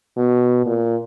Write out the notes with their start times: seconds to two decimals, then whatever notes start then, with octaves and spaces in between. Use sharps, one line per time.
0.17 B2
0.66 A#2